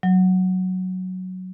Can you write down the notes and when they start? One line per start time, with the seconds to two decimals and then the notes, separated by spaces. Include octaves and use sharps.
0.03 F#3